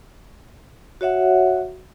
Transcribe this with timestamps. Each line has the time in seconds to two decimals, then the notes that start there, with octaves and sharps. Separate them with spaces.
1.01 F#4 C#5 E5 F#5